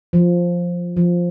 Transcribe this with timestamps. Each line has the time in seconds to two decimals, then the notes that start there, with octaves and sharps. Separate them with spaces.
0.13 F3
0.97 F3